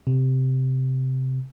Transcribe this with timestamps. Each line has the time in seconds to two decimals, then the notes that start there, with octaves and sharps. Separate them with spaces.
0.07 C3